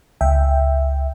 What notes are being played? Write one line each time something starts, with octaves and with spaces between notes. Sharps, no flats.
C#2 E5 G5